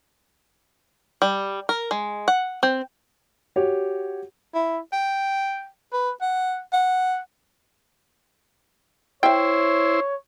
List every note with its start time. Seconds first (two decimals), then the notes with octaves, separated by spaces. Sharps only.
1.22 G3
1.69 A#4
1.91 G#3
2.28 F#5
2.63 C4
3.56 F#4 G4 C#5
4.54 E4
4.92 G5
5.93 B4
6.21 F#5
6.72 F#5
9.23 E4 C5 C#5 E5 G5